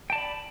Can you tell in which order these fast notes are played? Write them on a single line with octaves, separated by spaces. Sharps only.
G5 A5 D5 B5